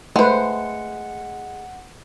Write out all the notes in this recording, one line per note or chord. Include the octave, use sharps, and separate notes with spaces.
G#3 A3 B4 C5 F#5